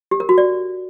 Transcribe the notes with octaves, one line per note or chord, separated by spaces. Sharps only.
G4
A#4
F#4
D5